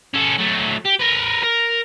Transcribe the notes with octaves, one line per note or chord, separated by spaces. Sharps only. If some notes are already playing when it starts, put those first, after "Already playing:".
C#4 A4
F#3 A3
G4
A#4 B4
A#4